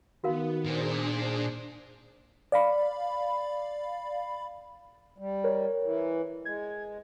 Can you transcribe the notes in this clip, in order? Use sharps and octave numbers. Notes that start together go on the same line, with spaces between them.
D#3 B3 F#4 A#4 F5
A#2 D4 G#4 C5
D5 F5 B5
G3
A#4 C#5
E3
G#3 G#6